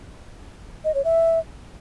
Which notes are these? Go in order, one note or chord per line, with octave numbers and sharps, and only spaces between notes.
D#5
C#5
E5